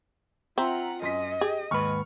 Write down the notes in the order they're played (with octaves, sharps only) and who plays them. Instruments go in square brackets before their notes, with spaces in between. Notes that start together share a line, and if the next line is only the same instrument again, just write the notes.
[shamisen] C4 [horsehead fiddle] F4 F#5 [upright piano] E5 A#5
[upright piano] F#2 C6 B6 [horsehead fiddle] D#5
[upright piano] G4 [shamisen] G#4
[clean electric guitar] D#2 G#2 B4 [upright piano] C#6 F6